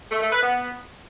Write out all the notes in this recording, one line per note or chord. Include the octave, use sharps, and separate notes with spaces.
A3
A3
B4
B3